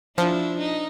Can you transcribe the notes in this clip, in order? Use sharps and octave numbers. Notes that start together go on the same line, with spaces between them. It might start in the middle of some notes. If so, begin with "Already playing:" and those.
F3 D4 E4
D#4